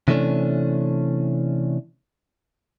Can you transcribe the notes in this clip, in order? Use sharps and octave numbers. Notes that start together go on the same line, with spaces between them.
C3 E3 G3 A3 C#4 D4